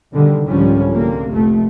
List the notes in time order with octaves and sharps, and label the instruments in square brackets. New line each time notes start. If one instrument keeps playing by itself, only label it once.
[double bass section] B2 D3 D#3 G3
C2 G#2 D3 F3 G3 C#4
D2 C3 A#3
F1 A3